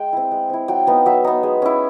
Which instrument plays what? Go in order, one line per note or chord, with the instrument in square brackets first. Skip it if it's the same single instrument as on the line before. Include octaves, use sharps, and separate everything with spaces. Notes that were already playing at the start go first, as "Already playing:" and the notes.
Already playing: [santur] G#3 G5
C4 E4
G#3
C4 E4
F#3 G5
B3 D#4 F5
F#3 E5
B3 D#4
G#3
C#4 E4